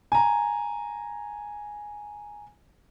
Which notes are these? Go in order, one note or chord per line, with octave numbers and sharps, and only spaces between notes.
G#5 A#5